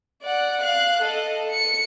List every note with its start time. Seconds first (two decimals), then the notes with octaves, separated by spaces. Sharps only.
0.23 D5 F#5
0.62 F5 F#6
1.02 A4 D#5
1.50 C#7